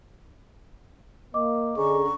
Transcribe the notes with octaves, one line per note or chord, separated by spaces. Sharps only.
A#3 D#5 D6
D3 C#4 G#4 A#5 C#6